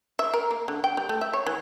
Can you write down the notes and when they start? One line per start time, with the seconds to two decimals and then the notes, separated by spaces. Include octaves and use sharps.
0.19 E5
0.34 A#4
0.51 A#3
0.68 D3
0.84 G5
0.97 G3
1.09 A3
1.21 E5
1.33 C#5
1.47 E3